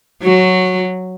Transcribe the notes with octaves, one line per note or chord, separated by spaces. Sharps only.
F#3 F#4